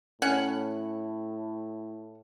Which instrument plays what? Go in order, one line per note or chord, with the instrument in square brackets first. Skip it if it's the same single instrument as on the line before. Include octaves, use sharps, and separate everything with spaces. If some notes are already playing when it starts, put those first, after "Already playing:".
[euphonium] A2 [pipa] C#4 F#5